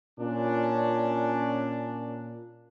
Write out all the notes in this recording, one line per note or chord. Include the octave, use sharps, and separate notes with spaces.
A#2 C#4 D4